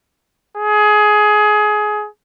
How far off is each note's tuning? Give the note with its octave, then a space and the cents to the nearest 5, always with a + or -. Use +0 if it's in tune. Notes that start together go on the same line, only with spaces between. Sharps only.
G#4 +20